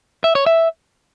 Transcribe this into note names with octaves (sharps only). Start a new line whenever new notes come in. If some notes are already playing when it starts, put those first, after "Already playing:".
E5
C#5
E5